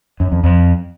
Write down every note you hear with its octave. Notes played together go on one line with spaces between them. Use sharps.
F#2
F2
F2